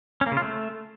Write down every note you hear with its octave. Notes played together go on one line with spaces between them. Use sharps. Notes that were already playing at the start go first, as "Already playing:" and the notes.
C#4
A#3
C#3
F4
A3